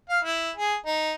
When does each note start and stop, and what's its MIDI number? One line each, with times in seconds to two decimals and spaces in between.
0.09 0.19 77
0.24 0.51 64
0.56 0.76 68
0.86 1.14 63